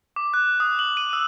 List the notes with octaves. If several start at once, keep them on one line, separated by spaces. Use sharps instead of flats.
D6
F#6
D#6
F#7
D#7
E6